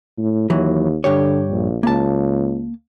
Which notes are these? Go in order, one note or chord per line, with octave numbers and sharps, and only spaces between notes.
A2
D#2 E3 F#3
G2 D3 G4 C#5
A#1
C#2 A#3 A5